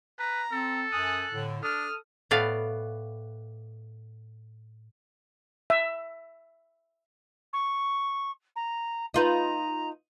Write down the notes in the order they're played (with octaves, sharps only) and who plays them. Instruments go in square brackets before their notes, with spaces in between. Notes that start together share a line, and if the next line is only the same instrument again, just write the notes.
[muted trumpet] B4 [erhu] A#5
[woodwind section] C4 [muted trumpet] A4
[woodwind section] F#2 G#5 D#6 [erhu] F#6
[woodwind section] A2 D3
[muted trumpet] D4 [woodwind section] A4 D#6 [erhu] F6
[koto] A2 B3 D5 F5
[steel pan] E5
[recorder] C#6
A#5
[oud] D#4 F4 B4 [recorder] A#5